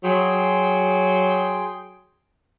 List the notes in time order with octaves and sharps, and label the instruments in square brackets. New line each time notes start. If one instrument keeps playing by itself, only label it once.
[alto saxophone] F#3 [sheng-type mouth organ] G#4 G5 C6